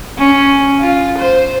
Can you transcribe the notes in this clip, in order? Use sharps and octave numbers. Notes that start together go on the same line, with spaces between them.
C#4
F4
C5